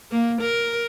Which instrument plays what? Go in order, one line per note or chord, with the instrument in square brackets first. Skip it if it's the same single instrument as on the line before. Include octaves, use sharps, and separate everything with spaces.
[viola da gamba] A#3
A#4